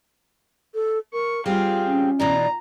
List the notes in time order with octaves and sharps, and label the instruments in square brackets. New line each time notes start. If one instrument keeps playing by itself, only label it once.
[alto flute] A4
[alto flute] A#4 [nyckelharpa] C#6
[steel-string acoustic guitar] G3 C4 G#4 [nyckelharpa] F4 F5 [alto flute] G5
[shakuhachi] C#4
[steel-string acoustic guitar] B2 E3 D4 [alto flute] D5 [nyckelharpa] A#5